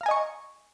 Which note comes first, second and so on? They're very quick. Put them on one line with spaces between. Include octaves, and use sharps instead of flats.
F5 A#5 G#5 D#5 C#6